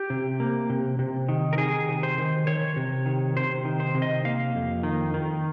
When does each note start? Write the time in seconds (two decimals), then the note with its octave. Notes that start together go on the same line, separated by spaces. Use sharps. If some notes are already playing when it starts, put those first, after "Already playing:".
Already playing: G4
0.10 C3
0.40 A#3
0.70 C3
0.99 C3
1.29 D#3
1.53 A#4
1.58 D#3 G#4
1.88 C3
2.03 C5
2.18 D#3
2.47 D#3 C#5
2.76 C3
3.06 D#3
3.36 C3 C5
3.65 D#3
3.80 C5
3.95 C3
4.02 D#5
4.25 A#3 F5
4.55 F2
4.83 D#3
5.14 D#3